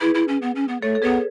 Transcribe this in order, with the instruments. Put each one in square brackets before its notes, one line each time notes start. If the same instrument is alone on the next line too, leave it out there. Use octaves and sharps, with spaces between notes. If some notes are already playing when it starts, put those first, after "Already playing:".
[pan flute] E4 [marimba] G#4 B4
[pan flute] E4
C#4
B3
C#4
B3
[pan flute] A3 [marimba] A4 C#5
[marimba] A4
[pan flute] B3 [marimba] G#4 B4